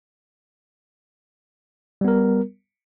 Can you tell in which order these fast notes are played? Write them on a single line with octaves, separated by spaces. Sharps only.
G3 B3 A#4